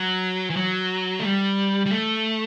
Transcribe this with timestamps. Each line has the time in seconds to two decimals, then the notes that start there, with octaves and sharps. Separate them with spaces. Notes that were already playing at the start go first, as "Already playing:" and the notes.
Already playing: F#3
0.50 E3
0.57 F#3
1.19 A3
1.24 G3
1.86 G3
1.91 A3